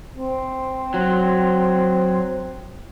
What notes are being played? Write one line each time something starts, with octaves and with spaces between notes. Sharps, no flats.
C4
F#3